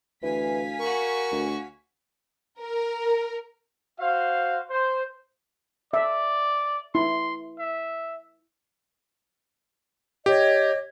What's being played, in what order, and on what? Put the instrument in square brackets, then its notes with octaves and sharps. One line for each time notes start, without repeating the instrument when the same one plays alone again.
[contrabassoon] D2 [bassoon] E3 [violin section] F5 G#5 B6
[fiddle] F#4 C#6 [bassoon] A#4
[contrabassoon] D2
[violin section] A#4
[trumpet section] F#4 C5 F5
C5
[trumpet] D5 [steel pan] E5
[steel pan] E4 [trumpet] C6
[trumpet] E5
[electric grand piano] G4 [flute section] C#5 D#5